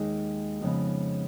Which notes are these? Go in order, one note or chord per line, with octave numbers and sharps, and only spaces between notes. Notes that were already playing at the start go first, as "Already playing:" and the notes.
Already playing: D#2 D#3 G#3 D#4 G#4
F2 C#3 F3 B3 D#4